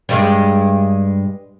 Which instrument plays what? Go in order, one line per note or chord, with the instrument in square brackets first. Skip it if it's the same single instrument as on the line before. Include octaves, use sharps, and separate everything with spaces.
[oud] G2 G3 G#3